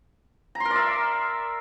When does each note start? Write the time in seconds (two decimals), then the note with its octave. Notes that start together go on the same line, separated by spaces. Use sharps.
0.55 A#5
0.60 C6
0.65 A#4
0.70 D5
0.76 E5